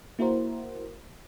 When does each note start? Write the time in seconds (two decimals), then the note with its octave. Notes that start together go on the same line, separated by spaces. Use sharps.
0.19 A#3 E4 F#4 A#4 C5